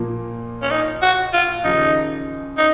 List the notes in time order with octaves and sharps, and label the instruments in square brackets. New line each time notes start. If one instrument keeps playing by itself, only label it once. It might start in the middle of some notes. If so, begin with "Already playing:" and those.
Already playing: [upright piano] A#2 F3 A#3
[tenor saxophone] C#4
D#4
F#4
F4
[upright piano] D#2 C#3 F3 [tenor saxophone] D#4
[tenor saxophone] D#4